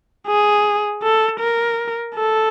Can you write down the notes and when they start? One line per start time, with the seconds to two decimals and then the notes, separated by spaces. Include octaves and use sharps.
0.27 G#4
1.03 A4
1.40 A#4
2.15 A4